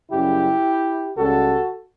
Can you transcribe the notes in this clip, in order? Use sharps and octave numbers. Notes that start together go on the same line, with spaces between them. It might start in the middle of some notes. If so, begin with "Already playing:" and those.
F#2 C#3 G3 E4 G4
C#2 C#3 G3 F#4 A4